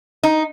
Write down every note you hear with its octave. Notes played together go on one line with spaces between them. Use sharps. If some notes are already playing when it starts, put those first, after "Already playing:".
D#4